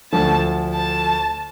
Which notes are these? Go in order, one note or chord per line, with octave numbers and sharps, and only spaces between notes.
D2 D3 F3 A5
A5